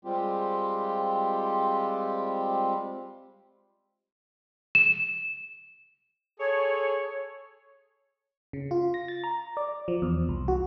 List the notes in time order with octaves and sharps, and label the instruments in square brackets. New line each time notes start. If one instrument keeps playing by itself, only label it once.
[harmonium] G3 G#3 C4 F4 G4
[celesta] E7
[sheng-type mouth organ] G#4 A4 [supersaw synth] C#5
[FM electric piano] C#3
F4
A#6
A6
A#5
D5
F3
E2
C2
F#4